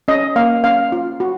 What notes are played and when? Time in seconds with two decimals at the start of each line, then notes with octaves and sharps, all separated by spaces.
0.08 C#4 D#5
0.36 A#3 F5
0.64 C#4 F5
0.92 F4
1.20 F#4